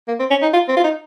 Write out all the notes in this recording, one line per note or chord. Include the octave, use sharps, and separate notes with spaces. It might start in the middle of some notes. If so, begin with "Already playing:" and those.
A#3
C4
C#4
D#4
F4
C4
F4
D#4